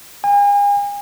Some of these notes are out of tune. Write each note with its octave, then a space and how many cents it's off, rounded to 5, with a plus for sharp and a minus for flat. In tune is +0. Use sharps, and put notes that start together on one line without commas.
G#5 -40